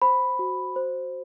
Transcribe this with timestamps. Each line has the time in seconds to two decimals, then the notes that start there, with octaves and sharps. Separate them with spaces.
0.02 C5 B5
0.39 F#4
0.76 C5